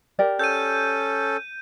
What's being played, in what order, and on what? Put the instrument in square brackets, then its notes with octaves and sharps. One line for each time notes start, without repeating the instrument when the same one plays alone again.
[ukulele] G4 A#4 D5
[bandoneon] C#4 A4 [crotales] G6 D#7